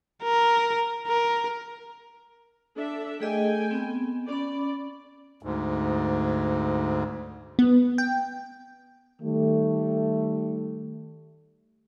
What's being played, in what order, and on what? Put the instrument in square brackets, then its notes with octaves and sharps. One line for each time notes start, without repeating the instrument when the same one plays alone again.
[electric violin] A#4
A#4
[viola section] D4 A4 E5
[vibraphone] A3 G#4 D#5 [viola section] A4 G5 G#5
[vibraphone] B3 C4
[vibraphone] C#4 B5 [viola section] D5
[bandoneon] D2 G#2
[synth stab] B3
G5
[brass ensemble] D#3 G3 A3